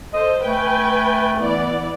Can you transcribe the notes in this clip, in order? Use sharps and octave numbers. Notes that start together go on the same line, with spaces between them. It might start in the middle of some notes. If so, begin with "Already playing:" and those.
A4 C5 D#5
A3 B4 G5 G#5
E3 B3 D5